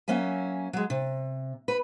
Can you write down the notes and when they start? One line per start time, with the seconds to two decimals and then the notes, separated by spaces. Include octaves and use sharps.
0.08 F#3 A#3 C#4 E5 G#5
0.73 F#3 G#3
0.90 C3
1.68 B4